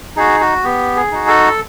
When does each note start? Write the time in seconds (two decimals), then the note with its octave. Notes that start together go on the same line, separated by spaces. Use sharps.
0.16 D#4 F#4 G#4
0.40 F#4
0.64 B3 G4
0.96 G#4
1.11 D#4 F#4
1.27 A4